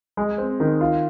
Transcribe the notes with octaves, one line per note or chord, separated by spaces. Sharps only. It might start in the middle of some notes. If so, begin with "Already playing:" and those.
G#3
C4
D#3
F4